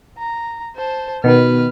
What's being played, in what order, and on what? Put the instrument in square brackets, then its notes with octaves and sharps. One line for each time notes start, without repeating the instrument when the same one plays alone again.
[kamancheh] A#5
C5 A5
[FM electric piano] B2 D#3 [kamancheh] B4 F6